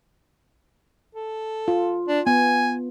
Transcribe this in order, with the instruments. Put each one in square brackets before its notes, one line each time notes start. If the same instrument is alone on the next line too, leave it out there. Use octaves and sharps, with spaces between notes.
[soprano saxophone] A4
[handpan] F4
[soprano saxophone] D4
[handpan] B3 [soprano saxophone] G#5